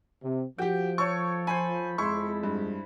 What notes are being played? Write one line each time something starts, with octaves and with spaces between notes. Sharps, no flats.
C3
F3 F#4 G4 G5
A4 C#5 C#6
C5 G#5 B5
F2 G#3 E4 C6 C#6
G2